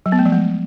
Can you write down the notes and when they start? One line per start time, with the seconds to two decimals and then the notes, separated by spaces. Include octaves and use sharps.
0.06 F#3
0.12 B3
0.19 A3
0.26 F3
0.32 G#3